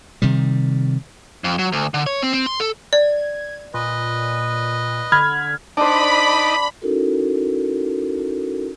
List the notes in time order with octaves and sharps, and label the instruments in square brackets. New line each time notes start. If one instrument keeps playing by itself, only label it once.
[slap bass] C3 D#3 G3
[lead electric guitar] F2
F#3
D2
D3
C#5
C4
C4
C6
A4
[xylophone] D5 [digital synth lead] G#6
[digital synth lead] A#2 [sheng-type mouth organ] B4 D#5
[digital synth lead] D3 [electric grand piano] B5 F6 G#6
[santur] D4 C5 [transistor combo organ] D#4 D5 [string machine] B5
[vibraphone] C#4 D#4 E4 F#4 A4 A#4